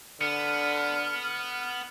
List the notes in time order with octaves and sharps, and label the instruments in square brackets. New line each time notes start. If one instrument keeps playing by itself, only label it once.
[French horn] D3 [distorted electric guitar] B3 [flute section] F6 [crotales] C#7